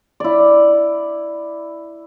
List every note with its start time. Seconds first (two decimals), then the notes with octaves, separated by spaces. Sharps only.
0.20 E4 D5